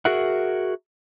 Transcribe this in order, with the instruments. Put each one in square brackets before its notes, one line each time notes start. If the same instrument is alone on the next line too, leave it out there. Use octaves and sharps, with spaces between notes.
[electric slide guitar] F#4 G#4 A#4 E5 F#5